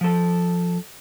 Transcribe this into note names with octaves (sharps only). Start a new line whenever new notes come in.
F3 A4